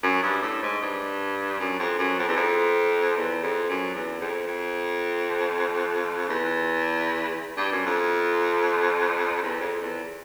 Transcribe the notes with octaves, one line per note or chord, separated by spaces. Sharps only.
F#2
G2
A2
G#2
G2
F#2
F2
F#2
F2
E2
F2
E2
F2
F#2
E2
F2
F2
E2
G2
F#2
F2
E2
F2
E2